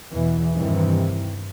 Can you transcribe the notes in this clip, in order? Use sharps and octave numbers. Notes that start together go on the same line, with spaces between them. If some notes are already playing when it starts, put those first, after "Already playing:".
E2 B2 E3
G2 C3 D#3 E3